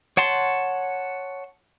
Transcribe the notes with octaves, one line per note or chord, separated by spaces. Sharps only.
C#5 F#5 A5 C6